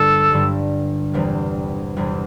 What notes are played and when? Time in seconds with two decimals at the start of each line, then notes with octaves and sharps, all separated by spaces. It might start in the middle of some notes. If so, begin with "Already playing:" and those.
Already playing: G1 G2 D3 G3 D4 A4
0.31 G1 G2 D3 G3 D4
1.13 E1 E2 C3 E3 G3
1.96 E1 E2 C3 E3 G3